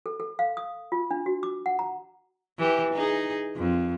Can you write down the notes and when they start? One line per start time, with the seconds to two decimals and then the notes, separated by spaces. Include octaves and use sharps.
0.06 A4
0.20 A4
0.39 F5
0.57 D#6
0.92 F4
1.11 D4
1.26 F#4
1.43 D6
1.66 F#5
1.79 A#5
2.59 E3 G4
2.93 D#4 G#4
3.57 F2